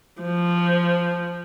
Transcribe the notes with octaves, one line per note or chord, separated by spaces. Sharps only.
F3